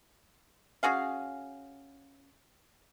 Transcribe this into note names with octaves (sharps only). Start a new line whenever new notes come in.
C#4 F#4 G#4 F5